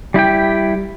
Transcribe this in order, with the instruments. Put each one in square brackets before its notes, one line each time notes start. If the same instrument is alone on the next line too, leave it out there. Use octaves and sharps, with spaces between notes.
[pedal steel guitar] G3 E4 G4 G5